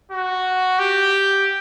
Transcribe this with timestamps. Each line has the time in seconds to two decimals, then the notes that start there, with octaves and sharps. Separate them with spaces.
0.11 F#4
0.79 G4